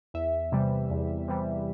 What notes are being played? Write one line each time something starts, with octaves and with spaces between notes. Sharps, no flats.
E2 E5
C3 E3 G3
E2
C3 E3 G3